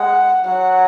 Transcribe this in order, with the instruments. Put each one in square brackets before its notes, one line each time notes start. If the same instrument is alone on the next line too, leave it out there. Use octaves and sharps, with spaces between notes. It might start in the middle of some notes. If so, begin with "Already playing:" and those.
Already playing: [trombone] G#3 [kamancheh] F#5
[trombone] F#3 [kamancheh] F#5